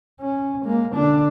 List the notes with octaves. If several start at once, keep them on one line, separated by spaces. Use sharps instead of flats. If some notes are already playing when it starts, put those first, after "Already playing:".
C#4
G#3 A#3
D3 D4